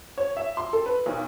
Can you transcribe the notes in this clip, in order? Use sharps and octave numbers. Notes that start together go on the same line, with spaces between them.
C#5
E5
C6
A4
B4
B1